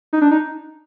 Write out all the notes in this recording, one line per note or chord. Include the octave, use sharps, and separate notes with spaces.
D#4
D4
D#4